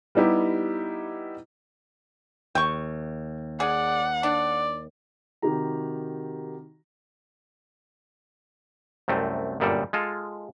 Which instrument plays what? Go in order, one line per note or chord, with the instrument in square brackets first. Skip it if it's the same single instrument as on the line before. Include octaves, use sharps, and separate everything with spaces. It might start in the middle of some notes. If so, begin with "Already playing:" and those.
[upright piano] G3 B3 D#4 E4 G4
[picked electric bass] D#2 [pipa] G5 C#6
[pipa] G#4 [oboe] D5 [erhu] F#5
[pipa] D4 [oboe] D5
[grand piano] C3 D#3 F#4 G4 A#5
[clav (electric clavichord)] C2 F#2 A3 C4
G1 F#2 A#2 G3 A4 D5
G#3 F4 A4